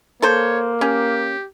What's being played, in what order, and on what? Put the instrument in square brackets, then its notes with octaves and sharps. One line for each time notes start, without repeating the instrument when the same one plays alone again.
[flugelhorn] A#3 [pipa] A4 C5 [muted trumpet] C#5
[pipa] C#4 [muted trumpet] G4